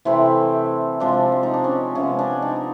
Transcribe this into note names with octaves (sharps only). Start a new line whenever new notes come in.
C3 E3 A3 C4 E4
C3 F3 G#3 D4
D4
D#4
D4
C#4
C3 F3 G#3 B3 C#4
D4
D#4